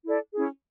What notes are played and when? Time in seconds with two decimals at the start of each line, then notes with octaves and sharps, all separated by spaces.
0.05 E4 A4 D5
0.33 C#4 E4 G#4